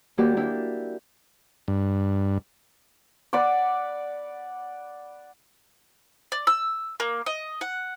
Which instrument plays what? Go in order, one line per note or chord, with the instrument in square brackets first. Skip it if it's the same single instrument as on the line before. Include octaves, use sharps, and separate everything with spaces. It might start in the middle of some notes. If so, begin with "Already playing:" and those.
[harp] D#2 A#3 F#4 G4 D5
A#3 D4 E4 G4
[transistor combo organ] G2
[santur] D5 F#5 B5 D6
[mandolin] D5
E6
A#3
D#5
F#5